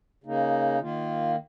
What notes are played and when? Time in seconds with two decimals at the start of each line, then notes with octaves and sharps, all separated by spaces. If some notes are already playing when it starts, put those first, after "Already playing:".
0.24 C#3 A#3 D#4
0.81 D#3 A#3 F4